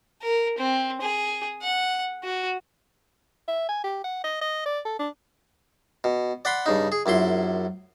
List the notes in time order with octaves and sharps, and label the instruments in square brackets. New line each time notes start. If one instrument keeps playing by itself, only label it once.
[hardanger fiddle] A#4
C4
G#4
F#5
F#4
[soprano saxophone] E5
G#5
G4
F#5
D#5
D#5
D5
A4
D4
[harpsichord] B2
D5 F#5 B5 C6
G2 C#3 D#4
G#4
A#1 F#2 E4 C6